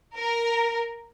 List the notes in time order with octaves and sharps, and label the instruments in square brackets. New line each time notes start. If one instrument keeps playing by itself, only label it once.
[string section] A#4